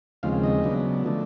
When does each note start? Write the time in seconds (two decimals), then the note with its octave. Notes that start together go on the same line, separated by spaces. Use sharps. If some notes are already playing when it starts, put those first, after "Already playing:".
0.23 D#2 C#3 F3 G#3 C4 F5
0.43 D#5
0.63 C#3 F#3 B3 D4
1.04 D3 F3 A3 D4